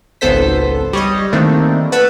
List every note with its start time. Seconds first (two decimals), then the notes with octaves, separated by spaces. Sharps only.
0.21 G#1 C#2 B3 A4 C5 B6
0.93 G3 C#5 D#5
1.32 D#3 A3 A#3 C4 D4 E4
1.92 B4 F#5 A5 B5 C#6 E6